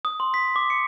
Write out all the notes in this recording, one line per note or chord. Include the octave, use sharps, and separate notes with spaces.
D#6
C6
B6
D6
C#7